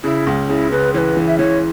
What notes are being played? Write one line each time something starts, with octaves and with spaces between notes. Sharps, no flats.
C#3 E4
C#2
C#3 E4
C#3 B4
E3 B4 C#5
E3
E5
E3 C#5